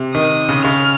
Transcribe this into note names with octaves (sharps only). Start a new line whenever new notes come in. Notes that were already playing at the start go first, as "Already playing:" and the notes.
Already playing: C3
D#3 D#6
C#3
C#3 F6